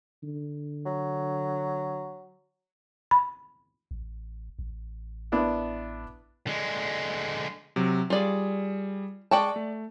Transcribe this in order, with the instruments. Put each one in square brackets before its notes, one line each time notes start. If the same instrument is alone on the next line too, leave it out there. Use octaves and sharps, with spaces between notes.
[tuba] D3
[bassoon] F#3
[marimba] B5
[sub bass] A1
A1
[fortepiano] B3 D4 E4
[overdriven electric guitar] D3 G#3
[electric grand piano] C3 F#3
[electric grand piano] G3 G#4 [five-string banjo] F4 D5
[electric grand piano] G#3 C#6 D6 [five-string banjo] D5 G5 A5
[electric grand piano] A3